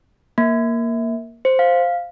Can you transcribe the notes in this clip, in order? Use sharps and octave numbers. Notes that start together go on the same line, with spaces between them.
A#3
C5
F5